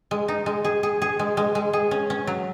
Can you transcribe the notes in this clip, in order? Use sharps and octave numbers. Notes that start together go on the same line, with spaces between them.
G#3
D#4
G#3
G#4
G#4
G#4
G#3
G#3
G#3
G#4
C#4
C#4
F#3